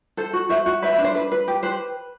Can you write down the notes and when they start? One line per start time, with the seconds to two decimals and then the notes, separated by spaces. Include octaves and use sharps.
0.17 A4 C5
0.33 F#4
0.49 F#4 C5 E5
0.66 F#4
0.82 B4 C5 E5
0.93 C5 E5
0.99 D4
1.04 C5
1.15 B4
1.32 B4
1.48 G4
1.63 B4 C5